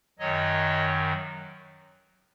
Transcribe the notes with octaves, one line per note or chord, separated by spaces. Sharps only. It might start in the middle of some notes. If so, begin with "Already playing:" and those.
F#2 D#3 F#3 C#5 D#5